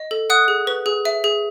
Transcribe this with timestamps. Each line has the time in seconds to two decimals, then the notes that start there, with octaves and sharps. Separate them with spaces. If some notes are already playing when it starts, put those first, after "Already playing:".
Already playing: D#5
0.11 A4
0.30 F#5 D#6 F#6
0.48 G#4
0.67 B4
0.86 G#4
1.05 E5
1.24 G#4